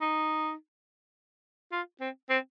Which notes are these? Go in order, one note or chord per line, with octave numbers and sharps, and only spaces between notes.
D#4
F4
C4
C4